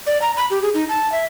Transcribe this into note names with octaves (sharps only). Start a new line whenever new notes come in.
D5
A#5
B5
G4
G#4
D#4
A5
E5